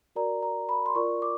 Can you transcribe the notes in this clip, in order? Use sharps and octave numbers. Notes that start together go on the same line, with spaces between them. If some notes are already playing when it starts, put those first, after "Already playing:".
F#4 A#4 D5 A#5
A#5
B5
C6
F4 A#4 D5 C#6
D6